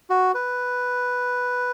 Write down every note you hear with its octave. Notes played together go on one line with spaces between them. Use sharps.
F#4
B4